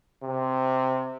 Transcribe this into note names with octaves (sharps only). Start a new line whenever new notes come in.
C3